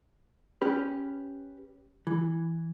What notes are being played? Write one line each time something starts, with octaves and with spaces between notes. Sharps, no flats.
C#4 G4 B4
E3